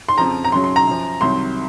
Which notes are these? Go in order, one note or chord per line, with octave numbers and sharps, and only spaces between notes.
C6
F2 C#3 F3 A#5
A#5
F#2 C#3 F#3 C6
C6
A#5
F#2 F3
C2 C3 D#3 F#3 C6